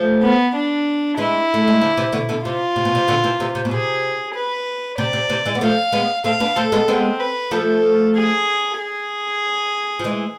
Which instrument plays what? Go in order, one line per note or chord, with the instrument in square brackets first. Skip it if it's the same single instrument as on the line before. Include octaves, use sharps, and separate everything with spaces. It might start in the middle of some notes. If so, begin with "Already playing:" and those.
Already playing: [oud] F3 A3
[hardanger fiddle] B3
D4
[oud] E3 G#3 [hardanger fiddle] E4
[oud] A3
G#3
D3 F3
C3 E3
B2 D3
B2 D3
[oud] C3 [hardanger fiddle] F4
[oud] C3
B2
C3
B2 D3
C3 E3
C3 E3
C3
B2
[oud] C3 [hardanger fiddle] G#4
[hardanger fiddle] B4
[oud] C3 [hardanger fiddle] D5
[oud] C3
C3 E3
E3 G#3
B3
[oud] F3 A3 [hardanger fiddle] F5
[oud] G#3 B3
[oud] A3 C4 [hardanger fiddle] F5
[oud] B3 D4
[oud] A3 C4 [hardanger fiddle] A4
[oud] G#3 B3
[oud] G#3 B3 [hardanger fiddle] C4
[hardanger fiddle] B4
[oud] F3 A3 [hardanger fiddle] A4
[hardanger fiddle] G#4
G#4
[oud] F3
E3 G#3